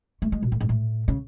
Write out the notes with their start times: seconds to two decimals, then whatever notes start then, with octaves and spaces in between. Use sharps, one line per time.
0.22 A3
0.32 G#3
0.43 B2
0.52 A2
0.60 G#2
0.69 A2
1.08 C#3